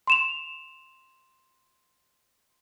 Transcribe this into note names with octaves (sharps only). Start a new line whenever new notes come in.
C6 E7 F7